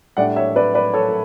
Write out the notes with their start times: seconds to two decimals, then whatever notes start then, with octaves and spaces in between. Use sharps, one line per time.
0.17 A2 G3 D4 D5 F#5
0.36 C#5 E5
0.56 B4 D5
0.74 B4 D5
0.94 A4 C#5
1.09 A4